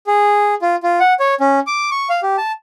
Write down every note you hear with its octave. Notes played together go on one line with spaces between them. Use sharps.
G#4
F4
F4
F#5
C#5
C#4
D6
C#6
F5
G4
A5